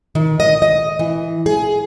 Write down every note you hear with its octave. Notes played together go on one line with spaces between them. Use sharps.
D#3
D#5
D#5
E3
G#4